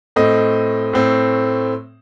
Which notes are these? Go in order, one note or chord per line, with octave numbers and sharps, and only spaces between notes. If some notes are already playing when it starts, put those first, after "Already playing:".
A2 A3 C4 D#5
A2 A3 C4